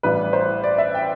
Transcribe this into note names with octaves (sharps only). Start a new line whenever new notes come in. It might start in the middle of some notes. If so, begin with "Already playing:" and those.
A1 A2 E3 G3 B4
C5
D5
E5
G5